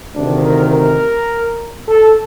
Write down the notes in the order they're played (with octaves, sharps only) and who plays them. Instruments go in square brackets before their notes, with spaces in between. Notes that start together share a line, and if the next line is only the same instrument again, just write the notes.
[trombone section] D2 C3 D#3 D4
A#4
A#4
A4